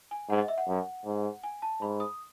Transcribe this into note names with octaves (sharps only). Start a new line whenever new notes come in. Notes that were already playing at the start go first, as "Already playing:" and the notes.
G#5
G#2 F#5
D#5
E5
F#5
F#2
G#2
G#5
A5
G#2 B5
D#6